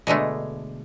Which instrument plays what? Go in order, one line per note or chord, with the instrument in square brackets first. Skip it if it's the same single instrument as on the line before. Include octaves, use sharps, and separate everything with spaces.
[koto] B2 D3 G#3 A3